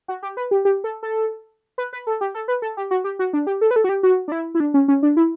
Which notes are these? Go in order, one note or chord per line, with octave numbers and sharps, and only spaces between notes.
F#4
G4
B4
G4
G4
A4
A4
B4
B4
A4
G4
A4
B4
A4
G4
F#4
G4
F#4
D4
G4
A4
B4
A4
F#4
G4
F#4
D4
E4
E4
D4
C#4
C#4
D4
E4